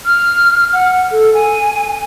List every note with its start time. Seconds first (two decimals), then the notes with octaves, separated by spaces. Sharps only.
0.06 F6
0.73 F#5
1.12 A4
1.34 G#5